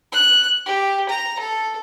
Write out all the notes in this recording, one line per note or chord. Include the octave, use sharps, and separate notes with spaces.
F#6
G4
A#5
A4